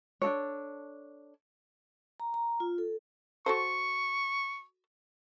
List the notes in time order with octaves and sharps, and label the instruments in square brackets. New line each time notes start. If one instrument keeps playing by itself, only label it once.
[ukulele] D4 D#4 A4 C#5
[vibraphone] A#5
A#5
F4
A4
[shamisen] F#4 A4 C5 [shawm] C#6